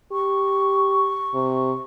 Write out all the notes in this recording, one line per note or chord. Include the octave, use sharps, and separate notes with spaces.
G4 C#6
C3